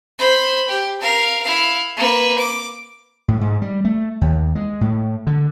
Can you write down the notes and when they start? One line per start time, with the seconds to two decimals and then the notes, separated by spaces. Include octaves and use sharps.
0.18 C5 B5
0.69 G4
1.01 A#4 F5
1.43 E4 F5
1.97 A#3 B4
2.39 D6
3.28 A2
3.41 G#2
3.62 G3
3.85 A3
4.21 D#2
4.55 G#3
4.81 A2
5.27 D3